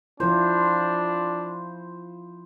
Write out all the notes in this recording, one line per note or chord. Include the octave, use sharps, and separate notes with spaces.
F3 D4 E4 F4 C5